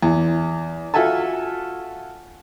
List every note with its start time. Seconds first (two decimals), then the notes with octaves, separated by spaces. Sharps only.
0.03 E2
0.94 F4 F#4 A4 E5 G#5 A5